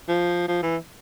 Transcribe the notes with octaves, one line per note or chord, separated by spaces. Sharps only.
F3
F3
E3